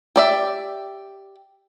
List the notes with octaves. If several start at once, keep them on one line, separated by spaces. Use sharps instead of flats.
G4 D5 E5